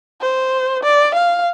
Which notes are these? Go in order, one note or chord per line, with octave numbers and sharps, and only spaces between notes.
C5
D5
F5